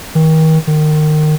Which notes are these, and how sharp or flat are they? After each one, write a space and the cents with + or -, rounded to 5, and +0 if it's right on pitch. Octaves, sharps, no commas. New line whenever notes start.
D#3 +35
D#3 -25